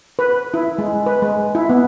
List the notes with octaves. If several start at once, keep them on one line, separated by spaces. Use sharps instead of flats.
B4
E4
G#3
B4
G#3
E4
B3